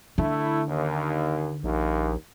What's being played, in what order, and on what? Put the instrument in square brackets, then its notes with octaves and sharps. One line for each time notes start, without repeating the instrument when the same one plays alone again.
[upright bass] D3 [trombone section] A3 E4
[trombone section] D#2
[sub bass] A#1 [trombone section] D#2